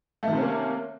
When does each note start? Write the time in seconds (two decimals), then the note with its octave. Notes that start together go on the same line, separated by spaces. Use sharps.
0.23 A3
0.28 D#3
0.32 C3
0.37 C#4
0.42 A#3